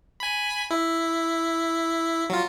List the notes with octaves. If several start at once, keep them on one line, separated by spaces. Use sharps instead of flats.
G#5 B5
E4
F#3 F4